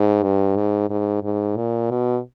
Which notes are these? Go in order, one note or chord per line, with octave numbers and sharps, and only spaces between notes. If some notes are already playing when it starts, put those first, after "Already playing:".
Already playing: G#2
G2
G#2
G#2
G#2
A#2
B2